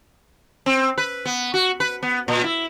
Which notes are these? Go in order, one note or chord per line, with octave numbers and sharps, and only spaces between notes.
C4
B4
B3
F#4
B4
B3
A#2
E4